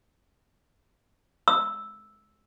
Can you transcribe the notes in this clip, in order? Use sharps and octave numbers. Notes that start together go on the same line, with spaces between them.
E6